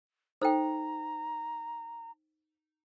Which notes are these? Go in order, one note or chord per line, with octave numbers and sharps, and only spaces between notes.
D#4 A4 C5 G5 A#5